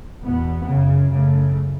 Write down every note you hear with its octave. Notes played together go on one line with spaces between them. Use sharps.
E2 B2 B3
F#2 C#3
F#2 C#3 A3